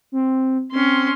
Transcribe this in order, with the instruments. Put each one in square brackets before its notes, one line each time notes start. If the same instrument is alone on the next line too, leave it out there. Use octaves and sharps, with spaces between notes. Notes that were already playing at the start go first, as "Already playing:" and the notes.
[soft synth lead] C4
[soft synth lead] C4 [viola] C#4 C6